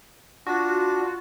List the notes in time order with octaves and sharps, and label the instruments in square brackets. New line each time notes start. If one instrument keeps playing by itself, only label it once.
[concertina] D4 [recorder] F4 [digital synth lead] F#4